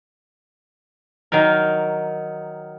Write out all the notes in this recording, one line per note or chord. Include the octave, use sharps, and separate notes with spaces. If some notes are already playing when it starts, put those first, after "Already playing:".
D#3 F#3 D#4 A#4